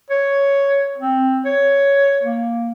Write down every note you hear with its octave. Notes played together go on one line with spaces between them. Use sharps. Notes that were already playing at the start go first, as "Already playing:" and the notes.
C#5
C4
C#5
A#3